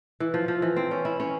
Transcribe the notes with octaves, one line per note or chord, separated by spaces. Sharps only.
E3
F3
F3
E3
C4
C#4
E4
C#4